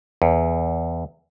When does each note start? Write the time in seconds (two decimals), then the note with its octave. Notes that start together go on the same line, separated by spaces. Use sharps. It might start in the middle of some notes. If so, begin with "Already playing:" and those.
0.22 E2